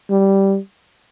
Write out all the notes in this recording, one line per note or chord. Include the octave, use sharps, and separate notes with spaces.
G3